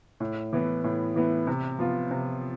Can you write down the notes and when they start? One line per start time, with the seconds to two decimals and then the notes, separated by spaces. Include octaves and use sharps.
0.20 A2
0.53 E3 B3
0.84 A2
1.16 E3 B3
1.47 C3
1.79 F3 B3 F4
2.11 C3